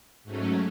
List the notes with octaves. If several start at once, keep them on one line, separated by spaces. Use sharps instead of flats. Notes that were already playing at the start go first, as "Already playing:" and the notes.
G#2 F#3 A3 C#4